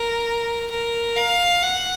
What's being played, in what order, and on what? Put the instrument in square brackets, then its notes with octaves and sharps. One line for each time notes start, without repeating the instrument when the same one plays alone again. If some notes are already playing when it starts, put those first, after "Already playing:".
Already playing: [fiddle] A#4
A#4
F5
F#5